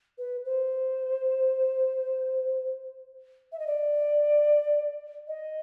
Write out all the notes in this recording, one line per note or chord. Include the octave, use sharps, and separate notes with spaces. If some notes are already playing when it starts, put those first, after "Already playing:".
B4
C5
E5
D#5
D5
D#5